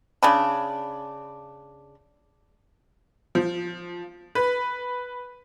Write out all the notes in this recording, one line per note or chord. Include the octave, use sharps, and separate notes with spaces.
C#3 D4 B5
F3
B4